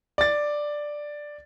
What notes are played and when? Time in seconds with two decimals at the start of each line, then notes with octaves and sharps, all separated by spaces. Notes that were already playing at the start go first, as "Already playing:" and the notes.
0.18 D5 A6